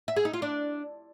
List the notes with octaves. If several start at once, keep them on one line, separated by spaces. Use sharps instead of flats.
E5
G#4
D#4
F4
D4